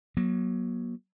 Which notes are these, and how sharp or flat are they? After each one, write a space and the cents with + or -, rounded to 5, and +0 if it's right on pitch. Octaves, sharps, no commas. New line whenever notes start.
F#3 +0 A#3 +40